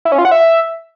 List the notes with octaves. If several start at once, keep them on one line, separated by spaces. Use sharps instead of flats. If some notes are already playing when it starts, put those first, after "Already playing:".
E4
C#4
F4
F#5
E5